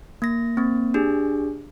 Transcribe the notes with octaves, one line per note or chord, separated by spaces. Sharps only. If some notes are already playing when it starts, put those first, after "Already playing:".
A#3 A#6
A#3 C4
D4 G4 G#4